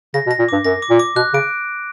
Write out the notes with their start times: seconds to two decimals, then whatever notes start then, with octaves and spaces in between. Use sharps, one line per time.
0.14 C#3 A#6
0.27 B2
0.31 A#6
0.39 A#2
0.48 G2 D6
0.64 F#2 A#6
0.82 D6
0.90 A#2
0.99 D6
1.16 B2 F#6
1.33 C#3 D7